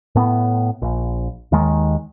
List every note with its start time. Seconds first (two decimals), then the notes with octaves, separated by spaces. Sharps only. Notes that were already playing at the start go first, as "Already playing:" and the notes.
0.15 A2 B3
0.82 A#1
1.52 D#2 D#3 G#3